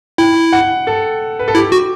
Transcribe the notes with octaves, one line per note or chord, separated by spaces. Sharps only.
E4 G5
F#5
A4
B4
A4
E4 G4
F#4